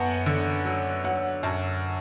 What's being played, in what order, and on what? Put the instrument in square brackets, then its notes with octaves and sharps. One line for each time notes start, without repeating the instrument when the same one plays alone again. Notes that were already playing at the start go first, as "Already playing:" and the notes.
Already playing: [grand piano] F#2 B3 F#5 A5
D3
F#3
F#3 F#5
F#2 A5